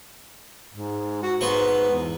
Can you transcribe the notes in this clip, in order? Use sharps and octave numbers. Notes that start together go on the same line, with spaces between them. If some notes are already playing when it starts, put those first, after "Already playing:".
G#2
F#4
G#2 B3 C5 C#6
E2